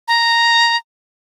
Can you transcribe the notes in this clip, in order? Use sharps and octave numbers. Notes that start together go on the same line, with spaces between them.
A#5